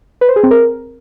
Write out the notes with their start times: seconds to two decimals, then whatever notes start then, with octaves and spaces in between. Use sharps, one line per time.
0.21 B4
0.29 C5
0.36 G#4
0.43 C4
0.51 A#4